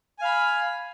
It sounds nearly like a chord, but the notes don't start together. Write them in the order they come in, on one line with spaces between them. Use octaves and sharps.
G#5 F5 B5